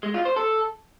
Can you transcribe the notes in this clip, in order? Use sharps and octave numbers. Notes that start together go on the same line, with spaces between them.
G#3
F4
C5
A4